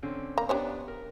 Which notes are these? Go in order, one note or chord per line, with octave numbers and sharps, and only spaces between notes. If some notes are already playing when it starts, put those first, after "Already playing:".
D3 C4 C#4
A#3 A#5
B3 D4 G4 C5 C#5
A#4